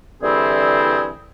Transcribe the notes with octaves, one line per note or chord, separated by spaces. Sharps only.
D3 E3 G3 C4 E4 G#4